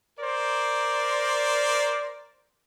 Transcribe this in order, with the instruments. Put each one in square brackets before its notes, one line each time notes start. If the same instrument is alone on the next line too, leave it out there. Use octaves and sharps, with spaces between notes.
[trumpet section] A#4 C5 D5